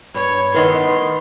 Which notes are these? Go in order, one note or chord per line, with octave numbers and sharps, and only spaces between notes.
G2 C#5 B5
A2 D#3 B3 B4 C6